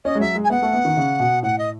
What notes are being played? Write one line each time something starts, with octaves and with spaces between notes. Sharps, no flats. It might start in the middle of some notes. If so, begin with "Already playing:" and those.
C#4 D#5
G#3
F#3 E5
G#3
G#5
B3 F#5
A3
B3
D#3
C#3
B2
A2 F#5
D#5